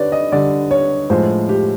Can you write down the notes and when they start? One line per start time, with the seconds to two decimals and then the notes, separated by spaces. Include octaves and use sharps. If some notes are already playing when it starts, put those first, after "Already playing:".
Already playing: D3 G3 B4 C#5 D5
0.12 D#5
0.32 D3 G3 D5
0.71 C#5
1.10 A2 F3 G#3 C5
1.49 G4